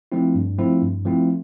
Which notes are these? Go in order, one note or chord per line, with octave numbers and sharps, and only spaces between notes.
F3 A3 C4 E4
G2
F3 A3 C4 E4
G2
F3 A3 C4 E4